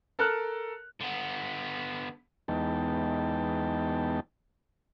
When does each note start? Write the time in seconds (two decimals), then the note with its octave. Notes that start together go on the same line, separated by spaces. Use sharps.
0.19 A4 A#4 A5 F6 F#6
1.01 D3 B3
2.48 E2 G#3 B3 D#4 G5 A5